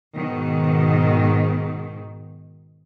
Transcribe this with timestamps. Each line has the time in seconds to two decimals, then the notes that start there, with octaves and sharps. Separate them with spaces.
0.16 G#2 B2 D#3